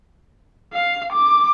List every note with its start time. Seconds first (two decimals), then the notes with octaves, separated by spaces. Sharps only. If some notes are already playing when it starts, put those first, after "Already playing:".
0.73 F5
1.12 D6